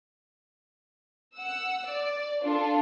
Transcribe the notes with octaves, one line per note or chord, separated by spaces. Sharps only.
F#5 E6
D5
D4 F4 A4